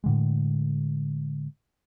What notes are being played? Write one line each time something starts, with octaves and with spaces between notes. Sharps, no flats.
A2 D3 G#3